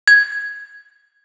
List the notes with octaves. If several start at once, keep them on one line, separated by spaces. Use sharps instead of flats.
G#6